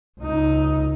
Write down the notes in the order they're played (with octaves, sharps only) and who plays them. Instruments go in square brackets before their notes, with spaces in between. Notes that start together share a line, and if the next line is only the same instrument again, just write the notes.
[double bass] C#2 D#4